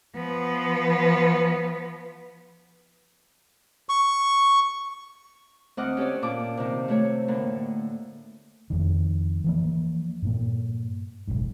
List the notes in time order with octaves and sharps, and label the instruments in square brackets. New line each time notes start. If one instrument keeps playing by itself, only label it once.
[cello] F3 B3
[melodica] C#6
[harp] D2 C4 D#5 F#5 D6 F6
C#4 G4 A4 C#5 D5
A#2 A5 D6
C3 D#3
C3 A3 C#5
A2 D3 A#3
[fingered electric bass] F2 D#3
E3 F3 A#3
G2 A#2 A#3
F#1 B1 G#2